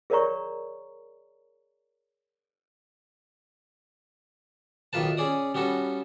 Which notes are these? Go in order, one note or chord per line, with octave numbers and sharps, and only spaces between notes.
G#4 A#4 C#5 D5 A#5 C#6
B1 A2 D#3 F4 B4 A5
C#4 G#4 D5 D#6
G3 B3 C#4 F#4 A4